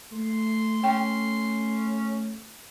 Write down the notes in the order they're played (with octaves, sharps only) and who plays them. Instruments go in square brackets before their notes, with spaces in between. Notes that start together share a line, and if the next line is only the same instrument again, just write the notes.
[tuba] A3 [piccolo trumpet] C6
[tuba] A3 [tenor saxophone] C#4 [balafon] G5